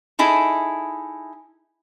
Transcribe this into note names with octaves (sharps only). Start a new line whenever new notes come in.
D#4 E4 G#4 A4